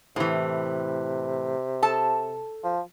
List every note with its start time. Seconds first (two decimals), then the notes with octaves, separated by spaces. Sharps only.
0.16 A2 C3 E3
1.83 A4 A5
2.64 F3